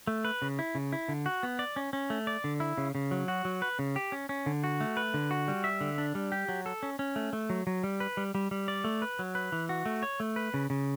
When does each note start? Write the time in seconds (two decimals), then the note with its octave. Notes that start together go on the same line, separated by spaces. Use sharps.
0.07 A3
0.25 B4
0.42 C#3
0.59 E4
0.75 C#3
0.93 E4
1.08 D3
1.26 F#4
1.43 B3
1.59 D5
1.76 C#4
1.93 C#4
2.10 A3
2.27 D5
2.44 D3
2.60 E4
2.78 C#3
2.95 C#3
3.11 F#3
3.28 F#4
3.45 F#3
3.62 B4
3.79 C#3
3.96 G4
4.12 C#4
4.29 C#4
4.46 D3
4.64 F#4
4.80 A3
4.97 B4
5.14 D3
5.31 F#4
5.48 G3
5.64 E5
5.81 D3
5.98 D4
6.15 G3
6.32 G4
6.49 F#3
6.66 A4
6.83 C#4
6.99 C#4
7.16 A3
7.33 A3
7.50 F#3
7.67 F#3
7.84 G3
8.00 B4
8.17 G3
8.35 G3
8.51 G3
8.68 D5
8.84 A3
9.02 B4
9.19 F#3
9.35 B4
9.52 E3
9.69 F#4
9.86 A3
10.03 C#5
10.20 A3
10.36 B4
10.54 C#3
10.70 C#3